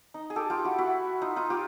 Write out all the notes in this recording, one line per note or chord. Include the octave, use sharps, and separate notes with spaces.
D#4
G#4
G4 A4
F4 G4
E4 F#4
E4 F#4
D#4 F4
D#4 F4
F4 G4